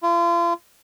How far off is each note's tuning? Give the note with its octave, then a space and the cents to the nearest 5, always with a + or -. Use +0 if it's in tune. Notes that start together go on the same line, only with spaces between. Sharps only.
F4 -35